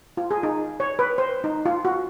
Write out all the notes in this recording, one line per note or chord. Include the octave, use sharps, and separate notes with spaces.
F4
G#4
D#4
C#5
B4
C5
D#4
F4
F#4